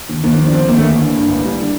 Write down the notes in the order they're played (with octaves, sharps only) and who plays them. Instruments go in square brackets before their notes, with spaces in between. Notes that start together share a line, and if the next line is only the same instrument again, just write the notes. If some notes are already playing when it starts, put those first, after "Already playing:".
[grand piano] D#2
D#2 A#3
A#3
F3
D4
D3 C4
D#2 A#3
A3
A1 A#3
D3
G2
A1
G3
D3